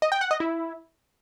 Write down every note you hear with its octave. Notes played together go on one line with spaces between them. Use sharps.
D#5
G5
F#5
D#5
E4